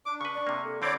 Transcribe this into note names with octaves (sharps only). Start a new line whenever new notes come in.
D4 D6
C#3 B4 C#6
D5
C3 A#3
A4
D3 C4 E4 C#5 D5 B5 D6